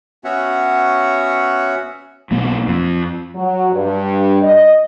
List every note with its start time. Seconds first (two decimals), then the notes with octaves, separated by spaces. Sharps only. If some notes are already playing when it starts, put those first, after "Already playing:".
0.24 B3 C#4 F#4 C#5 E5 F#5
2.31 B1 A#3 B3
2.67 F2
3.35 F#3
3.72 G2
4.43 D#5